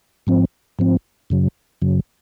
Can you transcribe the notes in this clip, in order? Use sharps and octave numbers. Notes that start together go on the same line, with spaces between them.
G#2 F3 C4
G#2 F3 C4
F#2 C#3 F#3
F#2 C#3 F#3